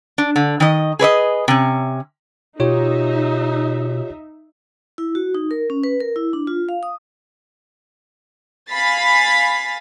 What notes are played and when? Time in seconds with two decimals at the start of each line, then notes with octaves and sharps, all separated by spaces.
0.18 D4
0.36 D3
0.60 D#3 D#5
0.99 G#4 B4 D5 D#5
1.48 C3 C#4
2.60 B2 D#4 F4 G4 C#5 E5
4.98 E4
5.15 F#4
5.35 D#4
5.51 A#4
5.70 C#4
5.84 B4
6.01 A#4
6.16 E4
6.33 D4
6.47 F4
6.69 F5
6.83 D#6
8.70 F5 G#5 B5 A6 B6 C7